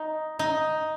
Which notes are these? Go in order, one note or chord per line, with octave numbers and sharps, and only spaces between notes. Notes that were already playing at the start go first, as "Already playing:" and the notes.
Already playing: D#4
D#4